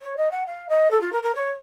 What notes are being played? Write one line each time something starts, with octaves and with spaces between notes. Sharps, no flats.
C#5
D#5
F#5
F5
D#5
A4
F4
A#4
A#4
C#5